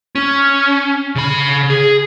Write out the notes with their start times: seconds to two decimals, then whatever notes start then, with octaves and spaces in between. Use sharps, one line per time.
0.15 C#4
1.16 C#3 B5
1.70 G#4